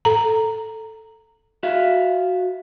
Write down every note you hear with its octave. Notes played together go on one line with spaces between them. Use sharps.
A4 A#5
F#4 E5 F5